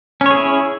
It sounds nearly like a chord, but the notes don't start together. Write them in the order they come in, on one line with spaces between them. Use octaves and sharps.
C#4 C#5 G#4 E4